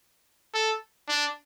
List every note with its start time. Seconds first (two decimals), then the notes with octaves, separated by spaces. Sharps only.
0.54 A4
1.09 D4